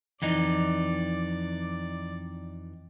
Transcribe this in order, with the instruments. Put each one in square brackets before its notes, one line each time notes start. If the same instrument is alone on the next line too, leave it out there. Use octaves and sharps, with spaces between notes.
[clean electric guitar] F2 E3 D#4 [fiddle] D5